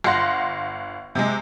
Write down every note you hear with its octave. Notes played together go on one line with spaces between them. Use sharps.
G1 F5 F#5 C6 A#6
C3 G#3